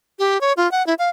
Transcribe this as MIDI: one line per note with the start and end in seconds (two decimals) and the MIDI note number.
0.19 0.40 67
0.41 0.53 73
0.57 0.70 65
0.71 0.85 78
0.87 0.94 64
0.99 1.09 77